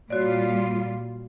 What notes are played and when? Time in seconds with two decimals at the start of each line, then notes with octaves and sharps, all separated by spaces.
0.10 A#2 G3 F4 F#4 C#5 D5